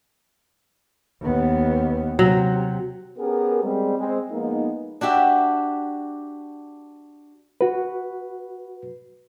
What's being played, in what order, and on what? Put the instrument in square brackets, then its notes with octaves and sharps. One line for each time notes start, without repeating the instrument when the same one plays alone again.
[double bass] D#2 B3
[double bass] C3 [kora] F#3
[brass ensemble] B3 C#4 G4 G#4 A#4
G3 G#3 C4
G#3 C4
F3 G#3 A#3 B3 D#4
[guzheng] D4 F#4 G4 E5
[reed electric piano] F#4 B4